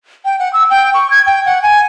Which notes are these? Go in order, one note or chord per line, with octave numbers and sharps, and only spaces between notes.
G5
F#5
E6
G5
C#6
G#6
G5
F#5
G#5